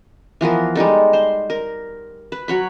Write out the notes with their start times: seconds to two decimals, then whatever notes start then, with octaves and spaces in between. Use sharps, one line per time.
0.41 E3 F3 B3 A#4
0.75 G3 G#3 D#4 A4
1.13 C5
1.50 A#4
2.32 B4
2.48 F#3 C#5 B5